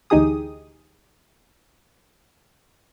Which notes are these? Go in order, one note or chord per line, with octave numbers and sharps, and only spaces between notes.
D2 E3 D#4 G4 G#4 D#6